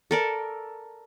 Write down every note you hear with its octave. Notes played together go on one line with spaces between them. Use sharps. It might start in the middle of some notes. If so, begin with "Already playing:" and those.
A4 A#4 D5